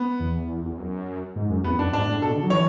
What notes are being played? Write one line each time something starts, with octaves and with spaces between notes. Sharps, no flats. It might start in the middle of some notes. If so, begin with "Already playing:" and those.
Already playing: B3
E2
E2
F#2
G#2
F#2
E2 B3
F#2 D4
G#2 D4
A2
B2 A4
D3
F#3
E3 C#5